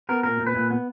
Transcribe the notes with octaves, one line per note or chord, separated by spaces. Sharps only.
B3 A#4
A#2 A#4
A#2
B4
A#2
B3